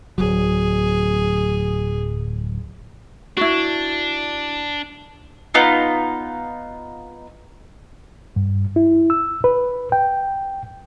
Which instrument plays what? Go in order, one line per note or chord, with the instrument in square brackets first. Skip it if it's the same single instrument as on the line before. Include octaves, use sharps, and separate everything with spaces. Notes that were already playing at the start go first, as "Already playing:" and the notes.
[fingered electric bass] D1 D#2 F#3 [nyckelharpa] G#4
[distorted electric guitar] D4 [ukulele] E4 F#4
[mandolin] B3 D#4 F4
[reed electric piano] G2
E4
E6
B4
G5